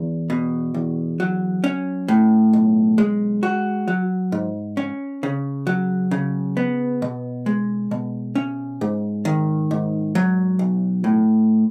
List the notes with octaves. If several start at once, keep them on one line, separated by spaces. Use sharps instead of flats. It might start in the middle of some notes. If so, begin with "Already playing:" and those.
Already playing: E2
B2
E2
F#3
C#4
A2
B1
G#3
F#4
F#3
G#2
C#4
C#3
F#3
C#3
B3
B2
G#3
B2
C#4
G#2
D#3
G#2
F#3
B1
A2